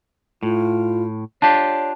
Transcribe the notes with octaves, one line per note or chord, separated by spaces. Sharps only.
A2 F4
D4 F4 G4 C#5 A5